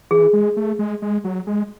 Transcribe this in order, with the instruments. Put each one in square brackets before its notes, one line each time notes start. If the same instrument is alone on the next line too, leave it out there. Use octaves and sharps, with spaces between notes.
[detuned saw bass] E3 [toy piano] G#4
[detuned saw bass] G#3
A3
G#3
G#3
F#3
G#3